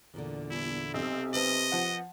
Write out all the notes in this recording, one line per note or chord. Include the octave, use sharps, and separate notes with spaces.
E2 A#2 D3
G1 E4
B1 C3 C4
C4 B4 D#5 A5
F3 F#5